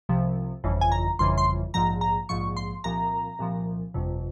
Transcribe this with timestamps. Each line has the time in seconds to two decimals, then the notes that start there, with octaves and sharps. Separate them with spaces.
0.09 C2 C3 F3
0.64 G1 F2 C#3 E3
0.81 G#5
0.92 A#5
1.19 G1 F2 C#3 E3 C6
1.38 C6
1.74 A#1 G#2 F3 A#5
2.01 A#5
2.29 A#1 G#2 F3 C#6
2.57 C6
2.84 C2 A#2 F3 A#5
3.39 C2 A#2 F3
3.94 G1 F2 C3